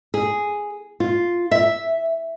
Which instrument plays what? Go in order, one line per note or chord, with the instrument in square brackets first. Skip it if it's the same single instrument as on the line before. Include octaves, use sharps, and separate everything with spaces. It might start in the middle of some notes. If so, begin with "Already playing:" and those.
[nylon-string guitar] G#4
F4
E5